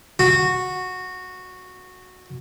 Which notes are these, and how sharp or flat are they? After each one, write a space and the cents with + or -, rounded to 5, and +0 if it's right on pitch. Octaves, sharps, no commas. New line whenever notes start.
F#4 -10